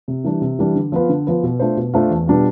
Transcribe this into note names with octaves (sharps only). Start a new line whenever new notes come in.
C3
E3 G3 D4
C3
E3 G3 D4
D3
F3 B3 F4 B4
D3
F3 B3 F4 B4
B2
A3 D4 F4 C5
B2
A3 D4 F4 C5
E2
B2 G3 D4 F4